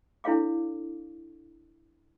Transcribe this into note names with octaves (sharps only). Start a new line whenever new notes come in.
D4 E4 A4 C#5 F5 D6